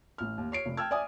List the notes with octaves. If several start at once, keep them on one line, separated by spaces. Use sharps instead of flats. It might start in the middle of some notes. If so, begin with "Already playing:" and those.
A1 F6
D#2
C#5 C7 D7
F1
G5 A5 E6 F6 G#6
D5 E5 G#5 D#6